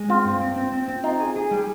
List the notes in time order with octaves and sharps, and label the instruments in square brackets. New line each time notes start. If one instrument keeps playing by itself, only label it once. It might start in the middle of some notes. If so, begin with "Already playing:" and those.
Already playing: [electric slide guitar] G#3
[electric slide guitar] C4 [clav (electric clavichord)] F4
[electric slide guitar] G2
C4
C4
C4
C4
[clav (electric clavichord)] D#4 [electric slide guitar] F4
[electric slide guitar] G#4
G#4
G3